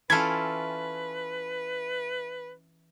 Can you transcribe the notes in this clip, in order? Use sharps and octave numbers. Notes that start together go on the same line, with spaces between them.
E3 C#4 E4 F4 A4 B4 G#6